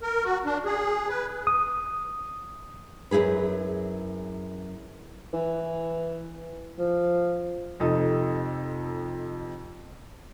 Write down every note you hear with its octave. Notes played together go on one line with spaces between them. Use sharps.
A#4
F#4
D4
G#4
B4
D#6
F#2 A#2 E4 G#4 B4
E3
F3
F2 C3 D#4 A4 D#6